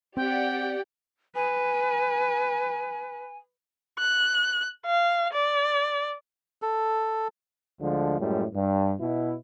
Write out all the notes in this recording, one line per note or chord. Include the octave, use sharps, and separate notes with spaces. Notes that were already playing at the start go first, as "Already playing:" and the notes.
C4 G4 D5 F#5 G5
B4 G#5
F#6
F5
D5
A4
D2 D3 F3 G#3
F#2 A2 G3 G#3
G2
B2 E4